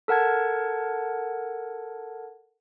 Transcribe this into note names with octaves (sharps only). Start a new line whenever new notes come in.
A4 A#4 F#5 A5 G#6